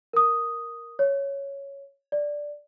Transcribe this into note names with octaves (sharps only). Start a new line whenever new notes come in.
A#4 D#6
C#5
D5